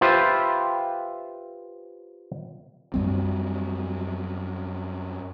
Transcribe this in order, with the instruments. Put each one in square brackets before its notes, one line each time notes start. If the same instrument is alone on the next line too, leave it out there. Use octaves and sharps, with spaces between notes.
[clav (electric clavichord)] F4 G4 B4 C5 E5
[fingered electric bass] F#2 G3 C4